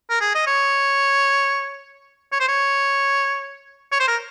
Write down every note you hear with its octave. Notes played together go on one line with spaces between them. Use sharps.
A#4
G#4
D#5
C#5
C#5
C5
C#5
C#5
C5
A#4